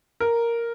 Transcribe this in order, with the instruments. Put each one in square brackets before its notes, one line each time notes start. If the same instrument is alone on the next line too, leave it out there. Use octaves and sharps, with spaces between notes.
[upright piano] A#4